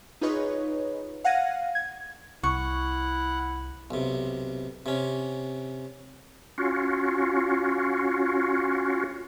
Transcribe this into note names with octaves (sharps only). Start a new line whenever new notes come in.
D#4 F4 G#4 B4 C#5 D#5
F5 F#5 G#6 A#6 D#7
G#6
C2 E4 F#5 C#6
B1 C3
C3 C#4
C#4 F4 F#4